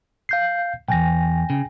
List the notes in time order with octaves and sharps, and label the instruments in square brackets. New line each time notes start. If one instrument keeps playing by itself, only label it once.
[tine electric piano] F5 G6 C7
[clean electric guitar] B1 E2 [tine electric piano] G5 G#5 A#6
[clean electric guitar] C#3